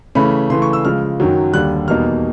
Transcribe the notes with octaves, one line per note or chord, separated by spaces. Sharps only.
C#3 E3 A3 C#4 B5
C#3 E3 A3 C6
C#6
E6
C#3 F3 G#3 F6
F#2 D#3 F#3
D#2 D3 G3 F#6
E2 B2 G3 A#3 D#4 F6